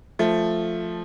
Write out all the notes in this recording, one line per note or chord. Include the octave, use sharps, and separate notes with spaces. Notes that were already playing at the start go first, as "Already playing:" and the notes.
F3 A3